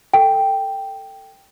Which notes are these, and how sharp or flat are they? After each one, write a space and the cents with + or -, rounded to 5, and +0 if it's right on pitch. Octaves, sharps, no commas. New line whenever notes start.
A4 +15 G5 +0